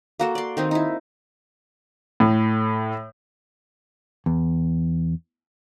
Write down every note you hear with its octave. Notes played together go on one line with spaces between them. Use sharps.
A#3 F#4 A4
D5 C6
D#3 C4 D#4
D#4 E4
A2
E2